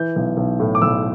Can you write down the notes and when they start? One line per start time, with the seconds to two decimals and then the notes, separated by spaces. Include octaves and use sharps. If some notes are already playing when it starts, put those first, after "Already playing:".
Already playing: E3 G6
0.16 B1
0.37 B1
0.60 A2
0.75 D6
0.82 B1 E6